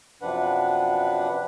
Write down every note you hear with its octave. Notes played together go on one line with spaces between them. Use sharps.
F#2 C3 F3 D4 B4 F#5